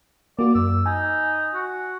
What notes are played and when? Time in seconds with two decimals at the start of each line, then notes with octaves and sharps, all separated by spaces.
0.39 A#3 F#4 D5
0.55 F#2 E6
0.86 D#4 G#5
1.55 F#4